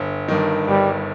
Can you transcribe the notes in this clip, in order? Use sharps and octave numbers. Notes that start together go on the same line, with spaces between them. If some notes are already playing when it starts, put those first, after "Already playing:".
Already playing: G1
G2 D#3
G1 G3